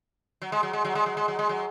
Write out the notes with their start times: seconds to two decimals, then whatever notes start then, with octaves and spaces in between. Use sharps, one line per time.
0.42 F#3
0.52 G#3
0.63 F#3
0.73 G#3
0.85 F#3
0.95 G#3
1.06 F#3
1.17 G#3
1.28 F#3
1.39 G#3
1.49 F#3